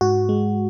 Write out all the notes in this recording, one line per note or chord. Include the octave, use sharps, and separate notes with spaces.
G#2 F#4
G#3